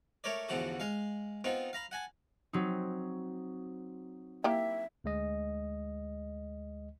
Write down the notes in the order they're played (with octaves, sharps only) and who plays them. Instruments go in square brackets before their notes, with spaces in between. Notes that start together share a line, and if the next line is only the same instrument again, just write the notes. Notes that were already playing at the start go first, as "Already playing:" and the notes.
[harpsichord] A3 A#4 C#5 D5
A1 E2 D3 F3 F#4 A4
G#3 F5
B3 C4 D#4 F4
F5 A#5 B5
F#5 G#5 A5
[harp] F#3 C4 D#4
[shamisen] A#3 E4 G4 [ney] E5
[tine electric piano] D2 G#3 D#5